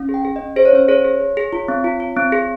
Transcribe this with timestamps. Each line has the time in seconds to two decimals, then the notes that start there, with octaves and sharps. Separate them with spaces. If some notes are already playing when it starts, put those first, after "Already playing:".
Already playing: C#4
0.09 G#4
0.14 G5
0.25 G#4
0.36 C#4 D#5
0.56 G#4 C5
0.65 C#5
0.73 C#4 C5
0.88 G#4 C#5
1.04 G#4
1.20 G#4
1.37 G#4
1.53 F4
1.68 C4
1.84 F4
2.00 F4
2.17 C4
2.32 G#4